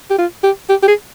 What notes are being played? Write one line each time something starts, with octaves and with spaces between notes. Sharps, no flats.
G4
F4
G4
G4
G4
G#4